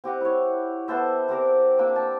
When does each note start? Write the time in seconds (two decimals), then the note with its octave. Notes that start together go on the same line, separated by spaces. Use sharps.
0.04 C4 G4 D#5 F#5
0.21 E4 C#5
0.88 B3 A4 C5 E5
1.28 C4 G4 A#4 D5
1.79 A#3 D4 G5 E6
1.96 A5